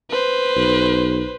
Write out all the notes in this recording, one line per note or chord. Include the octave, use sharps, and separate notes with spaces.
B4 C5
B1